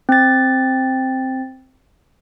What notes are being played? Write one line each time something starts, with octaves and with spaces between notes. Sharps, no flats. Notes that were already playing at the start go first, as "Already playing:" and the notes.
C4 A6